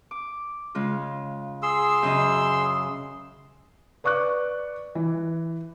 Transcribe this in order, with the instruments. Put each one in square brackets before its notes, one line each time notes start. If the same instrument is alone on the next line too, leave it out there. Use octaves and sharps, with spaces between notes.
[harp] D6
C#3 G#3 F4
[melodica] G#4 C6 E6
[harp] F#2 C#3 D#5
[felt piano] B4 D5 C#6 D6 F#6
E3